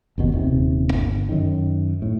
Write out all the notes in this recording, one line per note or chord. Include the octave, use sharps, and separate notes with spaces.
F#1 D#2 B2
D#1 C3
G1
F#2 D#3
A2